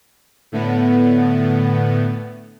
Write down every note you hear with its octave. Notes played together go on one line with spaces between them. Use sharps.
A2 D3 A3 B3